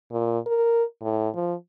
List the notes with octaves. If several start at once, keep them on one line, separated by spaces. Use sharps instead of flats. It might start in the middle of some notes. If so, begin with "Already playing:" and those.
A#2
A#4
A2
F3